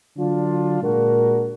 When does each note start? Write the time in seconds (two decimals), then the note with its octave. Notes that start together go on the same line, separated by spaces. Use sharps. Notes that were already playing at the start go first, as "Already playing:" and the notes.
0.16 D3 F#3 D4 F4
0.81 A#2 G#3 D4 F#4 A#4